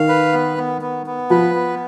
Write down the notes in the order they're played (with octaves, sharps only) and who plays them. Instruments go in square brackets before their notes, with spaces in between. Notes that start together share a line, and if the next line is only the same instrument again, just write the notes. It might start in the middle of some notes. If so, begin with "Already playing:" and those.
Already playing: [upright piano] D#3 [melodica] F5
[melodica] B4
B3
B3
B3
B3
[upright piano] F3 [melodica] B4
[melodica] B3